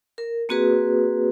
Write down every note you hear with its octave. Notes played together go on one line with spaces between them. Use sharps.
A#4
A#3 C4 F#4 G#4 B4